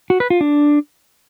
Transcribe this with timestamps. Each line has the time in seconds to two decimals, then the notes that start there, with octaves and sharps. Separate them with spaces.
0.10 F#4
0.20 B4
0.30 F4
0.41 D4